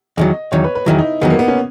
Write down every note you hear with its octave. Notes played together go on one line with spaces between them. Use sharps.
E2 D#3 F#3 D#5
E2 D#3 F#3 C#5
B4
B4
E2 D#3 F#3 E4
D#4
E2 D#3 F#3 B3
A#3
B3
C#4